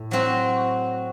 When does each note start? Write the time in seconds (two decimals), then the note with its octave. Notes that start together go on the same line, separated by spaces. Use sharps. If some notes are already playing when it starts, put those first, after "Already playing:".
Already playing: A2
0.11 F#3 C4 F#4